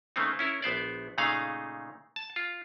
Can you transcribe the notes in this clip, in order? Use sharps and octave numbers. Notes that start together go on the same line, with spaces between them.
C#3 A3 A#3 C4 D#4
C#4 E4 A#4
A#1 B3 C5 D5
A#2 C#3 A3 D#4 G#4 F5
A5
F4